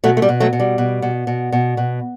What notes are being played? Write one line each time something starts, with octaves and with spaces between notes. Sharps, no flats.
B2 F#3 A3
A3
G3
B2
F#3 A3
B2
G3
B2
B2
B2
B2
B2